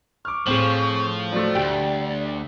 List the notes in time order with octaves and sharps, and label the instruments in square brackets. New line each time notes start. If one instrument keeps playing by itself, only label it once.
[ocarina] C#6 [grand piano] D6 F6
[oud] A2 G#4 [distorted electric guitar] F3 [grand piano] C4 F#7
[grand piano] F#3 A3 [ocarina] D5
[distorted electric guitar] D2 G#2 [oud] G3 [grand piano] G5